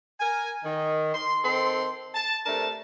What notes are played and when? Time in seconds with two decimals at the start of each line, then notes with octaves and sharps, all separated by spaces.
0.20 A#4 G#5
0.64 D#3
1.14 C6
1.44 D#3 C4 A4 C6
2.14 A5
2.46 C3 A3 D4 A#4 A5